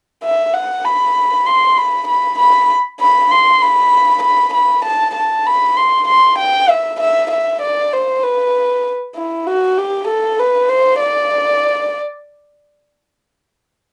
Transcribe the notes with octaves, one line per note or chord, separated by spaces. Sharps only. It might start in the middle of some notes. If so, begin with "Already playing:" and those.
E5
F#5
B5
C6
B5
B5
B5
B5
C6
B5
B5
B5
A5
A5
B5
C6
C6
G5
E5
E5
E5
D5
C5
B4
E4
F#4
G4
A4
B4
C5
D5